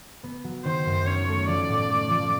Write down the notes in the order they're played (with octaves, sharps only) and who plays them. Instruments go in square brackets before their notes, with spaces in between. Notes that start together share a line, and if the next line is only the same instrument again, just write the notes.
[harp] B3
F#3
[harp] D#3 [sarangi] C5
[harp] F#2
[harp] C#4 [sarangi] C#5
[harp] A3
[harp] F3 [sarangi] D5
[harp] A2
A3
F3